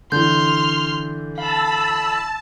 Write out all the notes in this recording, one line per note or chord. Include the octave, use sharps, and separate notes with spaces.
D3 E3 C6 F6 G6
F5 A5 B5 E6